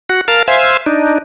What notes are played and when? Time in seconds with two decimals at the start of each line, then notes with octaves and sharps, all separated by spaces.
0.09 F#4 F#5
0.28 A#4 F5 A5 F6
0.48 C5 E5 F5 G#5
0.86 D4 D#4